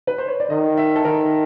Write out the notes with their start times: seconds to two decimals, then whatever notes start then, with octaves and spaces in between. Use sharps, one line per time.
0.07 B4
0.18 C5
0.28 C#5
0.40 D5
0.50 D#3 D#5
0.77 E5
0.96 A4
1.05 D#3 A#4